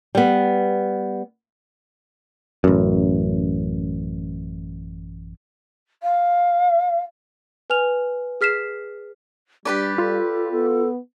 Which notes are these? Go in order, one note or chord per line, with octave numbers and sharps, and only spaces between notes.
G3 B3
A1 F#2
F5
B4 G#5 F6 F7
G#4 F6 B6 C7 E7
G3 D4 G4 B4 D5
F4 A4
B3 A4